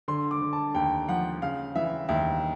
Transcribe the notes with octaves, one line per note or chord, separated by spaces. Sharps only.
D3 C6
D6
D3
A5
D#2 G5
F3 F#5
C#3 F5
E3 E5
D#2 E5